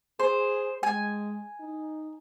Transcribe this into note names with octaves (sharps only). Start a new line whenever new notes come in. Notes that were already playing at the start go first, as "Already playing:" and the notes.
G#4 C5
G#3 G#5
D#4